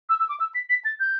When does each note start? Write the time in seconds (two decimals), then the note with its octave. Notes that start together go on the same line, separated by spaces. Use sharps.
0.09 E6
0.20 E6
0.29 D6
0.40 E6
0.55 B6
0.70 B6
0.85 A6
1.00 G6